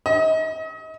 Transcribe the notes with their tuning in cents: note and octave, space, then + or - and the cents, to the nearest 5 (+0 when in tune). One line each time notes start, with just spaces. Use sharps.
D#5 +40